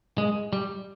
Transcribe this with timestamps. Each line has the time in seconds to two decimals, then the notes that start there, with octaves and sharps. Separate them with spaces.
0.18 G#3
0.53 G3